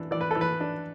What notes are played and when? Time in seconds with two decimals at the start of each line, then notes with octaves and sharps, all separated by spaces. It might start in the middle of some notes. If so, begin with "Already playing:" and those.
Already playing: E3 D4
0.11 E3 D5
0.21 B4
0.31 A4
0.35 E3
0.41 B4
0.61 D4